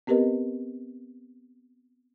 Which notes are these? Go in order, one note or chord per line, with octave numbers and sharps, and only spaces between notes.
B3 C4 G4 A#4 B4 D#5